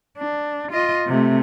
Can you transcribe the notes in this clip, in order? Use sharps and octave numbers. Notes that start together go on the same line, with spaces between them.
D4
F4 D#5
C3 A3